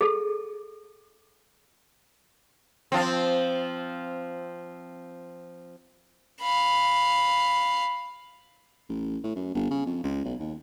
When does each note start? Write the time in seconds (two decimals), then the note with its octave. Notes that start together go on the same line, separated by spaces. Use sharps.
0.01 G#4 A4
2.92 F3 C4
6.42 F5 B5
8.89 A1
9.24 A2
9.36 F#2
9.55 G1
9.71 C#3
9.86 F2
10.04 C#2
10.25 B1
10.40 D#2